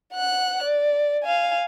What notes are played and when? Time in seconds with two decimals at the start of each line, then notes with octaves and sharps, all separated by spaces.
0.14 F#5 F#6
0.63 D5
1.24 F5 G#5